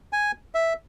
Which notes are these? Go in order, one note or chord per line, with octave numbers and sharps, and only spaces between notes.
G#5
E5